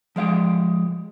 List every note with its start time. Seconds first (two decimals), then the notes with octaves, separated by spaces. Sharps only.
0.16 F3 G#3 F5 G5